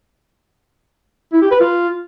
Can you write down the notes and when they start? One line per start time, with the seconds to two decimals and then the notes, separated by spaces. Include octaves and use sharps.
1.33 E4
1.42 G4
1.51 B4
1.60 F4